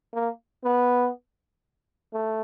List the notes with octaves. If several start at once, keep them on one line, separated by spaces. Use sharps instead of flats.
A#3
B3
A3